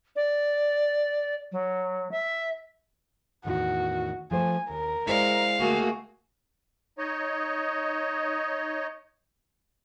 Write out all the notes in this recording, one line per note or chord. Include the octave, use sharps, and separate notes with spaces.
D5
F#3
E5
E2 A2 D#3 F#4
F3 A3 C5 G#5
D#2 A#4
G#3 E4 C5 D5 F5
D2 A3 A#3 F#4 G#4
D#4 C#5 D#5